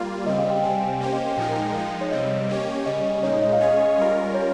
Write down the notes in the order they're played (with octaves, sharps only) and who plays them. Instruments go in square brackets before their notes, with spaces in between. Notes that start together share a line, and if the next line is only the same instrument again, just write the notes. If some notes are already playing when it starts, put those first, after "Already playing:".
Already playing: [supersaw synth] G3 A#3 F4
[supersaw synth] C#3 G3 C4 [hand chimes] D#5
[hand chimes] F5
G5
[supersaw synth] C3 G3 C4 [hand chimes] G#5
[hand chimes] G5
[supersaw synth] A#3 C#4 G4 C5 [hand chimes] F5
[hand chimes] D#5
G5
[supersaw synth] A#2 F3 G#3 D#4 A#4 [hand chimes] G#5
[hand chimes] G5
[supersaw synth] F3 G#3 D#4 [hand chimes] F5
[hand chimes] C#5
[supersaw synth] C3 G3 C4 [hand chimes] D#5
[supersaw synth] A#3 C#4 G4 C#5
[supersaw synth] C#3 G3 C#4 [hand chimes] D#5
[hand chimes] D#5
[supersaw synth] A#2 G#3 D#4 [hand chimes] C#5
[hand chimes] D#5
F5
[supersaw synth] G#3 C#4 G#4 C#5 [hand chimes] D#5
[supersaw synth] G3 C#4 F4 A#4
[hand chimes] C#5